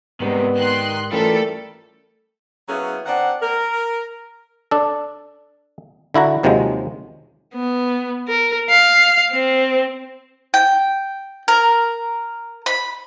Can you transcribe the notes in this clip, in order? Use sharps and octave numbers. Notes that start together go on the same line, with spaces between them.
G#2 C3 D#3 G3 G#3 B3
D#3 C6 F#6
E3 G3 A3 C#4 F4 A4 A#4
F#3 A#3 B3 C#4 E4 G#4
D#3 C4 D4 F#5
A#4
D4 A4
D3 E4 F#4 A#5
D#2 C3 D#3 F3 F#3 G#3
B3
A#4
F5
C4
G5
A#4
B5